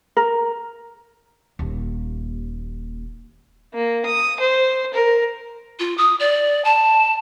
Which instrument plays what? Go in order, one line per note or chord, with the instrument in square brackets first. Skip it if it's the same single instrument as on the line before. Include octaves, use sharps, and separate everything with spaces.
[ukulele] A#4
[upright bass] D#1 D#2
[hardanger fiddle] A#3
D#6
C5
A#4
[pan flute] F4
D#6
D5
A5